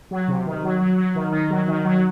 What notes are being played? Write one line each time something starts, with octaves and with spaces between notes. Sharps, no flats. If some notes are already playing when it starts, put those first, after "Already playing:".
F#3
C3
D#3
F#3
F#3
F#3
D#3
D#3
F#3
D#3
F#3